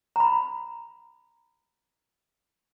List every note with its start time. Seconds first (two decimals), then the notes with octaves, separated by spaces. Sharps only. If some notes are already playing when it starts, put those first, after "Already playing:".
0.16 A#5 B5